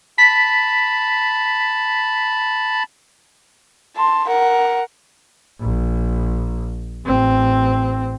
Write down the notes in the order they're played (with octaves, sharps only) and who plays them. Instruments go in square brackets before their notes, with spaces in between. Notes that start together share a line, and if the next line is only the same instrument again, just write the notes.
[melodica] A5 B5 [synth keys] B6
[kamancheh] A5 C6
A#4 F#5
[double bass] A#1
A1 C4